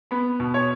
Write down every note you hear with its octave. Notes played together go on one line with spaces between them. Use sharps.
B3 B5
B2
C#5